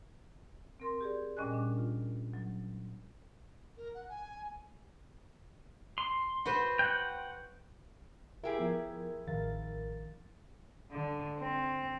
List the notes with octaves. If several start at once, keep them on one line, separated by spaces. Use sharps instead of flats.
C4 A#4 C6
G4 G#4 D5
A#2 G3 C#4 D#5 G#5 F#6
D4
F4
F#3
A#4
F#5
G#5
C6
F#4 B4 C5
F#5 G5
E4 G4 G#4 A#4 E5
F3 B3 A#4
A1 D#3 F3 A#4 F5 A6
D3
C4